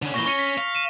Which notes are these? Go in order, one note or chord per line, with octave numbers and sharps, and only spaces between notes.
D3 C#4
A#2 E3 C#6 A#6 G7
C#4 C#6 A#6 C#7
B6
F5
D#7 E7